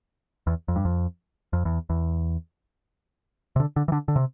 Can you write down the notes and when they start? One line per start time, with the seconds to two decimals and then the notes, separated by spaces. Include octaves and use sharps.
0.47 E2
0.68 F2
0.76 G2
0.85 F2
1.53 F2
1.65 E2
1.90 E2
3.56 C3
3.60 D3
3.76 D3
3.88 E3
3.92 D3
4.08 D3
4.16 C3